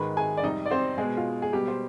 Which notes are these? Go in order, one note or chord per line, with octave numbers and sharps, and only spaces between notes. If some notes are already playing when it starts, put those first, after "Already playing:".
Already playing: G#2 D#3 G#3 B4 B5
G#4 G#5
D5
F2 C3 G3 D#4 D#5
D5
C4 C5
B2 G#3 G#4
F4
G#4
B2 G3 G4
C5